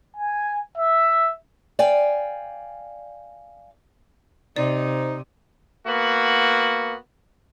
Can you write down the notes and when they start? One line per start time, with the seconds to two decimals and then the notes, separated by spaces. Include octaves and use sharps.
0.16 G#5
0.77 E5
1.79 D5 F5 G5 G#5
4.56 C3 D#4 C5 D5
5.87 A#3 B3 F#4